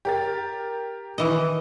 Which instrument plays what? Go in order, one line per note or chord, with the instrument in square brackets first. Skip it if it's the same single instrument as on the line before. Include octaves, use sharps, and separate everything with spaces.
[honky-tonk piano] G4 A#4 A6
[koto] D#3 E3 D#5